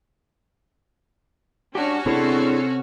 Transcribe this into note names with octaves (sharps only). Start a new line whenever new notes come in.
C#4 D4 F#4 G4 C#5
C3 C4 D4 E4 G#4 A4